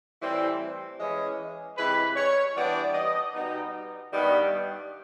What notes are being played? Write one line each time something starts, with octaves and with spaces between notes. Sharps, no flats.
A2 E3 G3 C4
E3 G#3 C#4
C3 E3 G#3 B4
C#5
E3 G3 B3 D4 D5
D#5
B2 G3 B3 D#4
G2 D#3 G3 B3